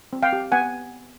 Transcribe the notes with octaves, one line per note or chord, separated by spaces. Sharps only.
C4
F5 G5
G4
B3 F#5 G#5